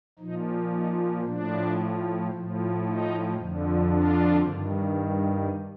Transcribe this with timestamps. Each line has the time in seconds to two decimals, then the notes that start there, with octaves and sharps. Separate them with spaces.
0.19 A#2 F3 D#4
0.72 D#4
1.25 A2 F3 D4
2.31 A2 F3
2.84 D#4
3.37 F2 D3 F3
3.89 D4 F4
4.43 G2 D#3